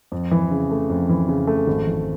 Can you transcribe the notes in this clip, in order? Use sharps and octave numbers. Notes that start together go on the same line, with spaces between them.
F2
E3
C#3
A3
F2
E3
C#3
A3
G#1
E3